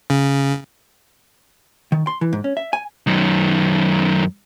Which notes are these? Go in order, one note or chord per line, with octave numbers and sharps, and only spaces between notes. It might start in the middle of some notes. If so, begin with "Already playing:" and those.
C#3
D#3
C6
E3
G#2
C#4
E5
G#5
F#2 D#3